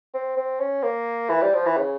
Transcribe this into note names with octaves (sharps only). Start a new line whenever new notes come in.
C4
C4
C#4
A#3
E3
G3
F3
E3
C#3